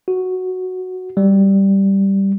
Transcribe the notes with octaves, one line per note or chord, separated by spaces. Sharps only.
F#4
G3